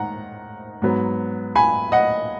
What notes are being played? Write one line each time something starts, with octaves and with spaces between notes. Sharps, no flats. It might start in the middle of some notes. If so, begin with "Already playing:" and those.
Already playing: G#2 D#3 F#5 A#5
G#2 F#3 B3
G#5 B5
D#5 F#5